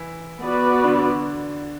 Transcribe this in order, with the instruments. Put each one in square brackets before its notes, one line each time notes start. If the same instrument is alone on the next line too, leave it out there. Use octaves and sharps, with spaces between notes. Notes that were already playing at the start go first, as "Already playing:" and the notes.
Already playing: [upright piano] E3 E4
[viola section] B3 F#4 B4 D5
[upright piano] D3 D4